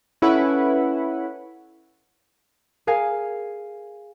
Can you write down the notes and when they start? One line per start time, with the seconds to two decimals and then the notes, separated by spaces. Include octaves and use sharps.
0.22 C#4 E4 A4 B4 F#5
2.87 G#4 A#4 F5 G#5